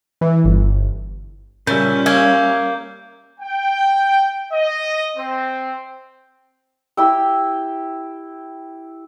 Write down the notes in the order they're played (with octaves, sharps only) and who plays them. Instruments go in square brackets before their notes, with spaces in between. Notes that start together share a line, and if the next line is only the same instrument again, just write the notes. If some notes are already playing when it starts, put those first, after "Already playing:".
[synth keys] E3
G1
[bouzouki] A#2 [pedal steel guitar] C#3 E5 [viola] G3 C#4 [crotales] G6
[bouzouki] A#3 [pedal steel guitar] E5 G#5
[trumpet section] G5
D#5
C4
[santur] E4 G4 G5 E6